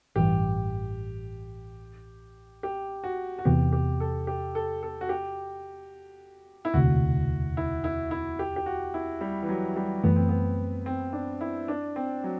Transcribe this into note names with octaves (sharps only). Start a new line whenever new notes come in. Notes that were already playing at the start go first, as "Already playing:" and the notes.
A1 G2 E3 G4
G4
F#4
F#4
E2 C3 E3 B3 G4
G4
A4
G4
A4
A4
F#4
G4
E4
E1 D2 C3 F#4
E4
E4
E4
G4
G4
F#4
E4
G3
E3
F#3
G3
F#2 E3 A3 B3
C4
B3
C4
D4
E4
D4
C4
F#3